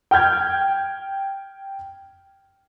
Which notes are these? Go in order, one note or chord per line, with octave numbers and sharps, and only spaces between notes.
G5 F6 G6 G#6